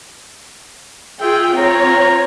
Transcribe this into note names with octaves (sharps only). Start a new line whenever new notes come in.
F4 G#4 E5 G5
C4 F4 C#5 A#5